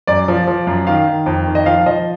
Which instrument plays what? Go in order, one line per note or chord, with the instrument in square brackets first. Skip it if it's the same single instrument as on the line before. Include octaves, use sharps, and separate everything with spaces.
[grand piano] F#2 D5
F3
F3
F#2
D#3 F5
D#3
F2
D#3
D#5
F3 F5
F3 D#5